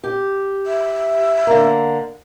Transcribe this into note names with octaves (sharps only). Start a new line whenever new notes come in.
G4
E5
D3 A#3